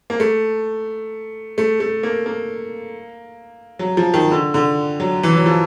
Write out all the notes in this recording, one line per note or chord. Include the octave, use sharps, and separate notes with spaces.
A#3
A3
A3
A3
A#3
A#3
F#3
F3
D#3
D3
D3
F#3
E3
F#3
F3